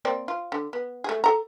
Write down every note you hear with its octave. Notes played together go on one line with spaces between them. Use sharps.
A#3 C4 D5
F4
D3
B3
A3 G#4
A4 A#5